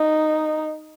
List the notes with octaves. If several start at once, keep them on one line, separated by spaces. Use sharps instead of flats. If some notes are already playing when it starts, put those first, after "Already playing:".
Already playing: D#4